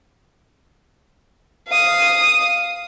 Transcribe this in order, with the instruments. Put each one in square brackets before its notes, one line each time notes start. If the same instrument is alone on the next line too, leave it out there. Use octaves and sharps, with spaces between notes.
[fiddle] F5 D#6